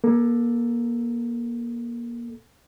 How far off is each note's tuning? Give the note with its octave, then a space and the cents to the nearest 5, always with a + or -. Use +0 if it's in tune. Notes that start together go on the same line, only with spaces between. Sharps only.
A#3 +25 A4 +0